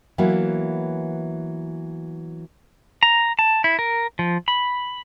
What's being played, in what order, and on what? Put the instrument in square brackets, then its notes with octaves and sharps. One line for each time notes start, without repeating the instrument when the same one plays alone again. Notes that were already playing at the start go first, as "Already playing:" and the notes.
[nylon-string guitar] E3 F#3 A#3 B3 E4
[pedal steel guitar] A#5
A5
E4
A#4
F3
B5